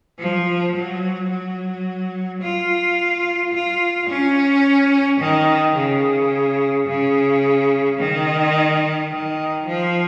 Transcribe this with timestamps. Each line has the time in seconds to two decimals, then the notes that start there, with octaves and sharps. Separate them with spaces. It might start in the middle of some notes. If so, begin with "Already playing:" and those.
0.19 F3
0.74 F#3
1.30 F#3
2.41 F4
3.53 F4
4.09 C#4
5.20 D#3
5.76 C#3
6.87 C#3
7.98 D#3
9.11 D#3
9.66 F3